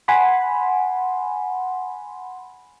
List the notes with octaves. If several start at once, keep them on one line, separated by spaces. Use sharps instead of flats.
F#5 G#5 B5 C6